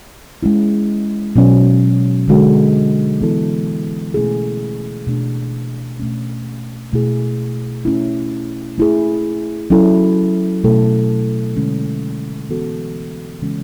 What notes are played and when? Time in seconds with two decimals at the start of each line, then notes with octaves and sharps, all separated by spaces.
0.43 G#3 C#4 E4
1.36 B2 F#3 C#4
2.28 D3 G#3 D4 F#4 A4
3.21 E3 B3 E4 A4
4.14 B2 A3 C#4 E4 G#4
5.07 B2 A3 D4
5.99 B2 A3 C#4
6.93 B2 A3 E4 G#4
7.85 A3 C#4 E4
8.78 A3 E4 G#4
9.70 F#3 C#4 E4 A4
10.64 B2 A3 E4 A4
11.56 D3 G#3 C#4
12.50 E3 B3 F#4 A4
13.42 C#3 E3 G#3 C#4